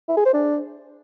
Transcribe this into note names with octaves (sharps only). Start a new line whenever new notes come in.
E4
G#4
C5
D4